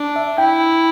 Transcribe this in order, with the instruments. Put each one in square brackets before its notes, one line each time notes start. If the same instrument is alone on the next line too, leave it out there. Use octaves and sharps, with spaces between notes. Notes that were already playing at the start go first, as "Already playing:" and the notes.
Already playing: [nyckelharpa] D4
[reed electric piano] E5
[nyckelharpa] E4 [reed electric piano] G5